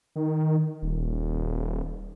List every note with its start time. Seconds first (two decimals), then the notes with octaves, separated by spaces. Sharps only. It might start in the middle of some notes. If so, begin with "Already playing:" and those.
0.16 D#3
0.82 D#1